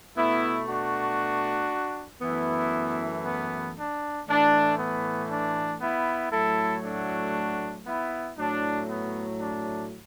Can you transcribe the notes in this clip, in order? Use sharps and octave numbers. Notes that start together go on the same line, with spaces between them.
B2 A3 B3 E4
D4 F#4
F#2 E3 A3 B3 E4
B3
D4
A2 E3 A3 D4
B3
D4
B3 E4
A2 F#3 A3 E4 A4
D4 F#4
B3 E4
A2 F#3 A3 D4
B3
D4